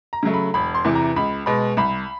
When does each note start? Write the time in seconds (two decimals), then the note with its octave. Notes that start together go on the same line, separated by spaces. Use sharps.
0.13 A#5
0.23 C#3 F#3 A3
0.34 B5
0.54 E1 B5
0.75 C6
0.84 E2 C3 E3
0.95 A#5
1.16 C#2 B5
1.46 B2 G#3 B5
1.77 C2 B5